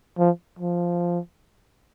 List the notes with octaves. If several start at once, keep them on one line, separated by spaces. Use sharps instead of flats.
F3
F3